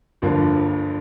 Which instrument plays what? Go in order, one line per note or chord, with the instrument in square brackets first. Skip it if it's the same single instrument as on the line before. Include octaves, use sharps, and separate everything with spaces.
[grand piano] G1 G2 D3 F3 A#3